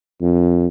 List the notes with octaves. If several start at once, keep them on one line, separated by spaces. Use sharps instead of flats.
F2